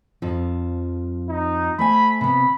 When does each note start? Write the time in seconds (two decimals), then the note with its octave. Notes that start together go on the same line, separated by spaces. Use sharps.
0.22 F2 F3
1.29 D#4
1.79 A3 C5 G#5 B5
2.21 C3 B3 B5